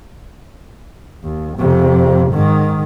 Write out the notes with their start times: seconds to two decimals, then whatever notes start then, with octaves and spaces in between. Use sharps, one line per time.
1.24 D#2
1.58 F2 C3
2.33 G#2 D#3